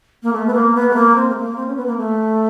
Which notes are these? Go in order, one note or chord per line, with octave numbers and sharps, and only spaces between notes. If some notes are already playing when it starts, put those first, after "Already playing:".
A#3
A3
B3
A#3
B3
A3
A#3
C4
A3
A#3
C4
C#4
B3
A#3
A3